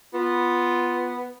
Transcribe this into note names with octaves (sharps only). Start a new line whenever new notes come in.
B3 F4